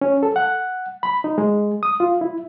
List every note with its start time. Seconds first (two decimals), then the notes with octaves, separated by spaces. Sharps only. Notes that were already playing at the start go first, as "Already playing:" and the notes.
0.01 C#4
0.23 A4
0.36 F#5
1.03 B5
1.24 D#4
1.38 G#3
1.83 D#6
2.00 F4
2.21 E4